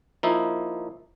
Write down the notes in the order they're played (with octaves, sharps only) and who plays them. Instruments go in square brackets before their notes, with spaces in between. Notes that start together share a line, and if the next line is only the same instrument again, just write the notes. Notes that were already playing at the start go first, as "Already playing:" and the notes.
[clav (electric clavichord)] F3 A#3 D#4 E4